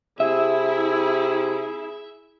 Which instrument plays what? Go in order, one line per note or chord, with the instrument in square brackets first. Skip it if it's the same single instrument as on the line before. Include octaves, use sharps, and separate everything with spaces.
[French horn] C3 [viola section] E4 [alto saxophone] G#4 [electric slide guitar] E5